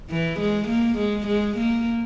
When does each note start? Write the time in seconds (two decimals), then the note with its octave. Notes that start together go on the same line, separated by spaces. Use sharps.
0.10 E3
0.40 G#3
0.68 A#3
0.98 G#3
1.27 G#3
1.57 A#3